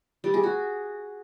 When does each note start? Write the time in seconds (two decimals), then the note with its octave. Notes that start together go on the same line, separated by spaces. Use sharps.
0.24 G3
0.34 G#4
0.44 F#4